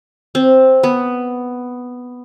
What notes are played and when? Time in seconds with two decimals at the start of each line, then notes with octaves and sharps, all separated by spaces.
0.35 C4
0.83 B3